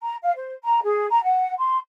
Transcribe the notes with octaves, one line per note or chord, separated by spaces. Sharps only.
A#5
F5
C5
A#5
G#4
A#5
F#5
C6